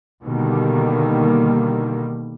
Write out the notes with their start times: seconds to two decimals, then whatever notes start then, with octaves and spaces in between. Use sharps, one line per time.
0.24 B2 D3 D#3 G3 A#3